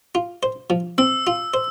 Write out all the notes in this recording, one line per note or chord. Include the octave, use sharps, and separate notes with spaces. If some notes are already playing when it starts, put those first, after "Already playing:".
F4
C5
F3
C4 E6
F4
C5